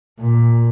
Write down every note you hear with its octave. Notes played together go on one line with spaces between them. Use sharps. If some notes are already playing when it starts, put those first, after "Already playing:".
A#2